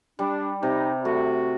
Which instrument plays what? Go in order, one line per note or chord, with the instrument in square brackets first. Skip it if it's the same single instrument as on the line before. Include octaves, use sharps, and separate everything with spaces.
[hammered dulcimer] G3 [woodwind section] D4
[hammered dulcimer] C3 [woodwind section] D#4
[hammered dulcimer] A3 [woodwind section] F#4